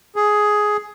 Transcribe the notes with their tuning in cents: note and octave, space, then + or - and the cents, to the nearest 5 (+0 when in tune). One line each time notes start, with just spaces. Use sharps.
G#4 +10